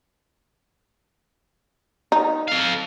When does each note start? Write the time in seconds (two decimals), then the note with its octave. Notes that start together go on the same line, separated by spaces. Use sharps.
2.12 D#4
2.48 A4 F5